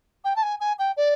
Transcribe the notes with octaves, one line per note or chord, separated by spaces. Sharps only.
G5
A5
G#5
G#5
G5
D5